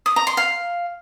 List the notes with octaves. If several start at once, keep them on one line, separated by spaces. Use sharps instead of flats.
D#6
A#5
C6
F5